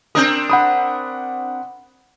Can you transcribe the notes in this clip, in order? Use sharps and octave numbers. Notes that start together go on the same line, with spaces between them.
C4 D4 A#4 D#6 G6
F#5 B5 D#6